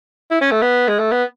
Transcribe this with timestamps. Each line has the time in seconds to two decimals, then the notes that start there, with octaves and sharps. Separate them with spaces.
0.31 E4
0.41 C#4
0.52 A3
0.62 B3
0.88 G#3
0.99 A3
1.11 B3